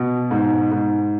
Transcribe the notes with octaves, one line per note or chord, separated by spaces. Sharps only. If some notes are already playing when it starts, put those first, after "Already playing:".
Already playing: B2
G#2
G#2